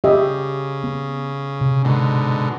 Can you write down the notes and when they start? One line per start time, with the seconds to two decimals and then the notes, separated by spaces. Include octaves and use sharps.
0.04 C#3 G4 D#5 E5
0.84 B3
1.61 C3
1.85 G#2 B2 D3